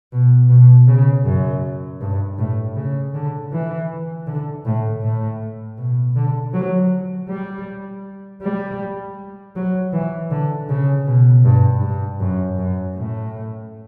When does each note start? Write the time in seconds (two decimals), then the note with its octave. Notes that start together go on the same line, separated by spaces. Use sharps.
0.13 B2
0.49 B2
0.87 C#3
1.25 F#2
2.01 G2
2.39 A2
2.76 C#3
3.14 D3
3.53 E3
4.27 D3
4.65 A2
5.03 A2
5.78 B2
6.16 D3
6.54 F#3
7.30 G3
8.43 G3
9.56 F#3
9.93 E3
10.31 D3
10.69 C#3
11.07 B2
11.45 G2
11.82 G2
12.20 F#2
12.58 F#2
12.96 A2